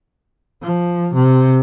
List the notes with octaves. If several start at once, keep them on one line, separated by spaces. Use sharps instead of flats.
F3
C3